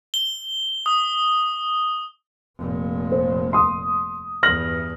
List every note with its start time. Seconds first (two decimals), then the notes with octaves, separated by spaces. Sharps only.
0.14 G7
0.86 D#6
2.58 F1 A#2
3.12 C5
3.53 C6 D#6
4.43 E2 G2 F6 A#6 F#7